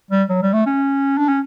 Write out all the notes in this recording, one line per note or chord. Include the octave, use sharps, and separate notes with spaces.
G3
F#3
G3
A3
C#4
D4
C#4